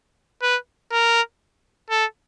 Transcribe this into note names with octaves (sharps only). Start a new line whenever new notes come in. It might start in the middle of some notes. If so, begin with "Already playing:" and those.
B4
A#4
A4